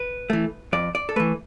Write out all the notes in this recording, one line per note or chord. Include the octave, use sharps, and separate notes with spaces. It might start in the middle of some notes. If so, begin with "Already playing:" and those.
Already playing: B4
E3 A3
F2 D5
D5
A4
E3 A3 B4